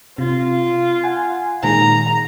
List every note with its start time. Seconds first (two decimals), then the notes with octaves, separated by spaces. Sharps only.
0.18 C3 F4
1.04 F#5 G#5
1.63 A#2 D#3 G#3 A#5